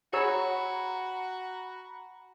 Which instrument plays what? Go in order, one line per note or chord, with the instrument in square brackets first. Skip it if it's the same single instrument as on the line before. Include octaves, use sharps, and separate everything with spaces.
[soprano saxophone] F#4 [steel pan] G#4 C#5 E6 [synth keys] A#5 B5